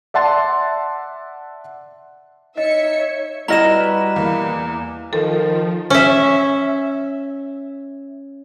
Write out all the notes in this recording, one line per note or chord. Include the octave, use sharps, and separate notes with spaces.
D5 E5 F#5 A5 C6 A6
D#4 C#5 D#5 E5 C#7
G3 E4 F#4 B4 D#5 A#5 F6 E7
E2 A#3
D#3 F3 A4
C#4 E5